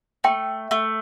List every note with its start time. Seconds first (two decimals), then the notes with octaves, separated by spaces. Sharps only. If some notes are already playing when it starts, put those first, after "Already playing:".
0.24 A3 G5
0.71 A3